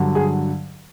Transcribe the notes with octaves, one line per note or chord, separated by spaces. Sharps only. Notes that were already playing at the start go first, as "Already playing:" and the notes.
Already playing: G2 D3 F#3
G#4